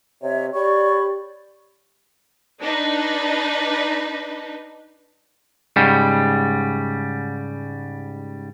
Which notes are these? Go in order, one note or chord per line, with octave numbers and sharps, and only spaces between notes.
C3 C#5 D#5 E5
G4 C#5 D5 B5 C#6
D4 D#4 B4
G#2 C#3 G3